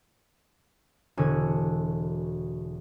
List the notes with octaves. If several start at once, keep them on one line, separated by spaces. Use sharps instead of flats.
E1 D3 F#4 G#5